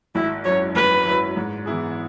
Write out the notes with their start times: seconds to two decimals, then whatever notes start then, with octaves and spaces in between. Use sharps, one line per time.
0.15 G#1 E4
0.45 F#2 F#3 E4 C#5
0.75 G#1 B4
1.06 F#2 F#3 E4
1.37 G#2
1.66 E3 B3 E4 G#4